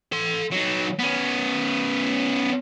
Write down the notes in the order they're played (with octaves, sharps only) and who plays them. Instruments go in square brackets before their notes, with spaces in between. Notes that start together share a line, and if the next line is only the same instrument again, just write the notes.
[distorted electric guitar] A4 C6
F#3 D#4
B3 C#4